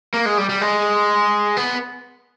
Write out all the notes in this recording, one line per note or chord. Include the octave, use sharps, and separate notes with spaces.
A#3
G#3
G3
G3
G#3
B3